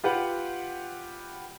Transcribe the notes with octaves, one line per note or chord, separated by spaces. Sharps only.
F4 G4 B4 F#5